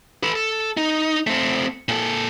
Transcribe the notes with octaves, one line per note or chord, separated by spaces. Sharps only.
A4 B4
A4
D#4
A3 C4
A#2 A4